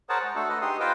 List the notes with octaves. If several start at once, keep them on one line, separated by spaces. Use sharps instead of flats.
G#4 A#4 C5 C#5 F#5 A5
G#3
A3 D4 F#4 A4
B4 D#5
D#4 G4 G#4 C6 D#6
F4 B4 C5 D#5 F5 G5